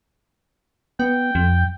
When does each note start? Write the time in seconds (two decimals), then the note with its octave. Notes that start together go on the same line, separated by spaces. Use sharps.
1.00 B3 G5
1.35 F2